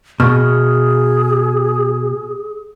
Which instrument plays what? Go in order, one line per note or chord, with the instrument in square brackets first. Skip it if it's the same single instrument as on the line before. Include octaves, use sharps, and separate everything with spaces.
[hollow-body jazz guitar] B2 [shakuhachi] G#4 [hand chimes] C#6 F6